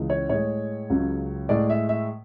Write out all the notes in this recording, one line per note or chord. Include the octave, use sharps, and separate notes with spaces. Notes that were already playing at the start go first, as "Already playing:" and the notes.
Already playing: C#2 C#3 E3 G#3
C#5
A2 G#3 C#5
C#2 C#3 F#3
A2 G#3 D5
E5
E5